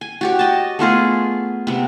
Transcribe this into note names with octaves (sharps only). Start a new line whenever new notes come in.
G#5
F#4 G4 C#5
D#5 A5
A3 B3 F4 G#4
C3 B3